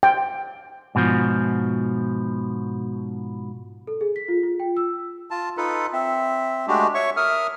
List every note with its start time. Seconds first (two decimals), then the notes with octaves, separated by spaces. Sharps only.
0.03 G5
0.95 G#2 B2 D#3 F3
3.87 A4
4.01 G#4
4.16 B6
4.28 F4
4.43 F4
4.60 G5
4.77 E6
5.31 F4 A5
5.57 D#4 F4 A4 B4
5.93 C4 E5
6.68 G#3 A3 D4 F#4 G4
6.95 C#5 E5 C#6
7.17 A#4 E5 D#6 F6